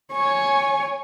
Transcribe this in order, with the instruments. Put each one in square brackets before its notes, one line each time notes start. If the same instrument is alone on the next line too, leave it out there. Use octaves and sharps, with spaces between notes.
[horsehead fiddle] C#5 G#5